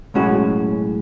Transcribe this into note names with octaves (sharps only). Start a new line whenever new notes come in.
B1 A2 G#3 C#4 F#4